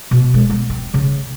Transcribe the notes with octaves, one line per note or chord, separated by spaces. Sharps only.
B2
G#3
B3
C4
C#3